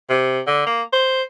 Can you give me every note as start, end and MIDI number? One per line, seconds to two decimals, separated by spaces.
0.10 0.40 48
0.47 0.62 50
0.66 0.82 58
0.93 1.23 72